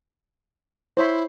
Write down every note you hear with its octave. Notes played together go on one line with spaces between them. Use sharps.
E4 C5 C#5 B5